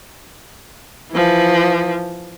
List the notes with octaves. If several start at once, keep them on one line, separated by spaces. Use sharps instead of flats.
E3 F3